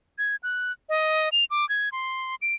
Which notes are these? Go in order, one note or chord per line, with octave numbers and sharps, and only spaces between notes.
G#6
F#6
D#5
F7
D6
G#6
C6
D7